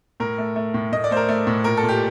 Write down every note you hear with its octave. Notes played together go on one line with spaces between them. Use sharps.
A2 A#4
A3
A3
A2
A2 D#5
D5
A3 C5
A#4
A3
A2
A#2 A#4
A4
A#2
G4